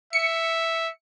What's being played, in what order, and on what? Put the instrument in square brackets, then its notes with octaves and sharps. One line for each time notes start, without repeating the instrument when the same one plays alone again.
[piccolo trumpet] E5 [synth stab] C#7